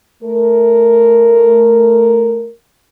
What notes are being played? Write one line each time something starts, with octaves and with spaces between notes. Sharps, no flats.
A3 A#4